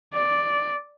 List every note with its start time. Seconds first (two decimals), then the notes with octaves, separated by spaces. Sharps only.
0.14 D5